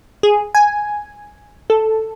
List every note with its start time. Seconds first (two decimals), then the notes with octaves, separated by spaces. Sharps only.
0.23 G#4
0.55 G#5
1.70 A4